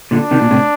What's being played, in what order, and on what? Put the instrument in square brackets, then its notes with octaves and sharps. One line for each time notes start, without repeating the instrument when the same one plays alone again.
[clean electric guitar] A#2 D3 [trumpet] D4
[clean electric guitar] C3 D#3
A#2
A2 C3